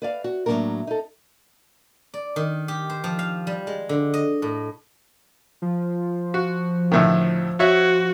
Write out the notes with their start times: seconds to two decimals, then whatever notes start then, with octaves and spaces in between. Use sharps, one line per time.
0.02 B4 D5 F5
0.24 F#4
0.46 A2 F#3 G#3 A#3 D4 A#4
0.87 D#4 A4
2.14 D5
2.36 D#3
2.68 G4
2.89 C5
3.04 F3
3.19 F5
3.47 G3
3.67 G#3
3.89 D3
4.14 D#5
4.42 A2
5.62 F3
6.34 F#4
6.92 D2 A2 D#3
7.60 F#4 C#5 E5